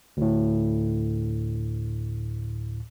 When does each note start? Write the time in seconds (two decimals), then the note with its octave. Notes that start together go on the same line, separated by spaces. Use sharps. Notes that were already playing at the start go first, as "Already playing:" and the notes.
0.17 D2 A2